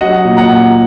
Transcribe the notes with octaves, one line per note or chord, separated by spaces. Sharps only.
F#3 D#5 F#5
A#2
F#5 A#5
A#2